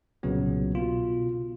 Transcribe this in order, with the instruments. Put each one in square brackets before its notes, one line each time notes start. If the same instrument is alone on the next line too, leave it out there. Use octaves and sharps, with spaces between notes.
[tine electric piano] C2 A#2 C#3 F#3 B3
B2 F4